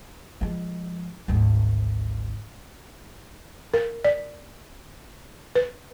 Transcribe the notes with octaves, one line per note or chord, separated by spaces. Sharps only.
F3 G#3
G#1 D2
A#4
D5
B4